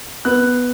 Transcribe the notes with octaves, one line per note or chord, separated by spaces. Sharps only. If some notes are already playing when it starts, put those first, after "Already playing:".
B3 F#6